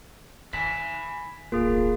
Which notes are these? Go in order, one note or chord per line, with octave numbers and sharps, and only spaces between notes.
D#3 G#5 B5 B6
D1 B1 A#3 F4 G#4 F5